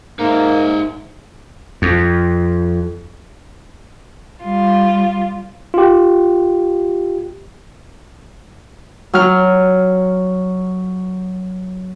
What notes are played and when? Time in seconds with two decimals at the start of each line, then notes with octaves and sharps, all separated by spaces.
0.19 G#2 A#3 D#4 E5
1.82 F2
4.43 G3 F4
5.74 F4 G4
9.14 F#3 F6